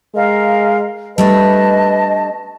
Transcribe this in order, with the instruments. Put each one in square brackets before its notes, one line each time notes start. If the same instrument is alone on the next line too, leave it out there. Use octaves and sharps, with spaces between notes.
[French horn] G#3 [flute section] A#4 D#5 F5
[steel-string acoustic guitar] G3 A3 D4 [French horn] B4 [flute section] D#5 A5